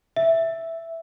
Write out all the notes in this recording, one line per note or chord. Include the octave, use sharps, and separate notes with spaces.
E5